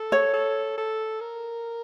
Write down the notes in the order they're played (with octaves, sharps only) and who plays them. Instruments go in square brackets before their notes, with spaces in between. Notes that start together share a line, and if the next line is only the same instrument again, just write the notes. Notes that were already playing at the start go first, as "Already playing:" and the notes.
Already playing: [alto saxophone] A4
[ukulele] C#5
[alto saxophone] A4
A4
A#4